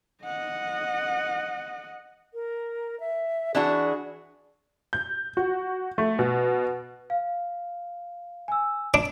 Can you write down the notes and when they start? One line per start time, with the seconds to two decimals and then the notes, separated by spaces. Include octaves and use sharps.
0.24 D#5 F#5
2.34 A#4
3.00 E5
3.55 E3 D4 F#4 G#4
4.93 G6
5.37 F#4
5.98 A3
6.19 B2
7.10 F5
8.48 G#5 E6
8.94 D4